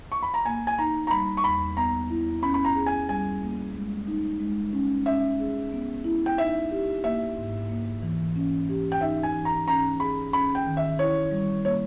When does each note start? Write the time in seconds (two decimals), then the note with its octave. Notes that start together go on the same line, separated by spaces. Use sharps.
0.12 C#6
0.23 B5
0.34 A#5
0.45 A#3 G#5
0.67 G#5
0.78 D#4 A#5
1.07 A#5
1.10 G3 B5
1.37 C#6
1.44 E2 B5
1.77 B3 A#5
2.10 E4
2.42 C#4 B5
2.54 B5
2.65 A#5
2.75 G#4
2.86 G#5
3.09 G3 G#5
3.41 A#3
3.74 G#3
4.07 D#4
4.40 G#3
4.73 C#4
5.06 C#4 E5
5.39 G#4
5.72 B3
6.04 E4
6.26 G5
6.38 D#4 E5
6.71 G4
7.04 A#3 E5
7.37 G#2
7.69 A#3
8.02 E3
8.36 C#4
8.69 G4
8.92 G5
9.01 D#4 E5
9.23 G#5
9.35 E3
9.45 A#5
9.67 C#4 A#5
10.00 G#4 B5
10.33 C#4 B5
10.55 G5
10.67 D#3
10.77 E5
10.99 E4 C#5
11.31 G3
11.64 A#3 C#5